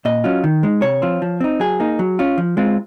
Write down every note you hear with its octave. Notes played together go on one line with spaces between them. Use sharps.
A#2 D#5
F#3 C#4 F4
D#3
G#3 D#4
C3 C#5
F3 C4 F4
F3
C4 D#4
F#3 G#4
A#3 D#4
F#3
C#4 F4
F3
G#3 C4 F4